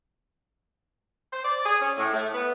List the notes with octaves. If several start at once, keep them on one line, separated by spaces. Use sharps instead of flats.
C5
D5
G#4
C#4
A2
A3
B3